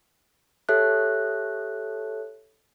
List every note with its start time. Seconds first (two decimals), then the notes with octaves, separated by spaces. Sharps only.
0.69 G4 A4 C#5 E5 A5 F#6